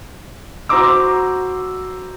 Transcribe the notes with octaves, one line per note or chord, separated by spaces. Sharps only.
F#4 C5 A#5 C6 D6 E6